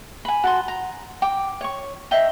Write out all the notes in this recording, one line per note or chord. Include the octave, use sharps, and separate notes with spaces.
G#5 B5
F#4 A5 C6
A#5
G5 D6
C#5 C#6
D#5 E5 G5 A#5